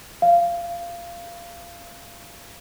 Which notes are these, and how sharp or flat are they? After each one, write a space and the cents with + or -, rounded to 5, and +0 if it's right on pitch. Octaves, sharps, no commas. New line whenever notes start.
F5 -20